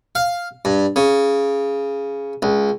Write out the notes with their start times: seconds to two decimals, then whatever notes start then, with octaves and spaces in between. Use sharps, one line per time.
0.15 F5
0.65 G2
0.96 C#3
2.42 C#2